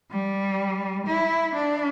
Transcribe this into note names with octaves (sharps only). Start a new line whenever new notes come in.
G3
E4
D4